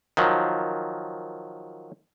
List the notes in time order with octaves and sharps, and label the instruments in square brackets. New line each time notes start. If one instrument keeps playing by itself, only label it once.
[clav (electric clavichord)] D#3 F3 F#3